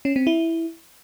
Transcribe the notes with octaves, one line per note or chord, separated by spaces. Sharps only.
C#4
C4
E4